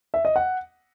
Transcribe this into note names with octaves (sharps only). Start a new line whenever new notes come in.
E5
D#5
F#5